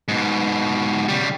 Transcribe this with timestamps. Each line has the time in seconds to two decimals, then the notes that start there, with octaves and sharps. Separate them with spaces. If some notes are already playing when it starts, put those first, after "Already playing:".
0.08 G#2 B2
1.08 C#3 G3